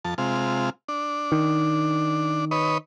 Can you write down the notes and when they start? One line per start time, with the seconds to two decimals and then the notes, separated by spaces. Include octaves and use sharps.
0.05 F2 A5
0.18 C3 G#3 F4
0.88 D4
1.32 D#3
2.51 B4 C#5 D#5